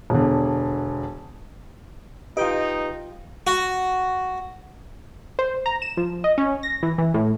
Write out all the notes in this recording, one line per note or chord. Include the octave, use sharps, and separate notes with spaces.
E1 D3
D#4 F4 G4 B4 D#5 G5 D7
F#4
C5
A#5
E7
F3
D#5
C#4
A#6
E3
E3
A2